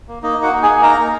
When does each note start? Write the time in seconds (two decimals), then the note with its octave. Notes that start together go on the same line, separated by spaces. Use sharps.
0.08 A#3
0.22 A#3 D#4 D#5
0.38 D#4 F#4 F#5
0.53 D#4
0.63 G#4 G#5
0.68 A#3
0.82 D#4 A#4 A#5
0.98 D#4